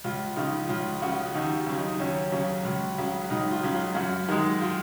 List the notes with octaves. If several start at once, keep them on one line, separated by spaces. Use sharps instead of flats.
C#2 F4
C#3 F3 D#4
C#2 F4
C#3 F3 F#4
D#2 D#4
F4
C#3 F#3
D#4
D#2 C#4
C#3 F#3
C#2
C#3 F#3
C#2 D#4
F4
C#3 F#3
F4
F#2 F#4
D#3 G#3 D#4
F4